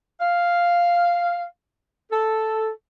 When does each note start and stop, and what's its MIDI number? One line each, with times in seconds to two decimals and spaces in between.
0.21 1.44 77
2.11 2.70 69